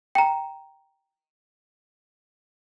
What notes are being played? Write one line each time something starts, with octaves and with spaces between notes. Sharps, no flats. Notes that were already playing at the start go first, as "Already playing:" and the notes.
G5 A#5